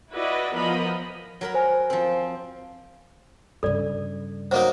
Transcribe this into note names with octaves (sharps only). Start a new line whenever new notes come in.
E4 F#4 B4 D5 D#5
E3 F3 B3 A#4 D#5 B5
F#3 A#4 B5
C5 G#5
F3 C4
G2 C#3 A4 D5
F#3 A#3 D#4 C5